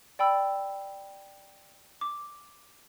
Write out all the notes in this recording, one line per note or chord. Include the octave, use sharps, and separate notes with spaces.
D5 G5 B5 E6
D6